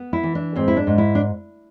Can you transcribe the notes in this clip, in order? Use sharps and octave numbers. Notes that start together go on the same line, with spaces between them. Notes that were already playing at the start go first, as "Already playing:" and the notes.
Already playing: B3
E4
E3
D4
G#2 C4
E4
D4
G#2
E4
D4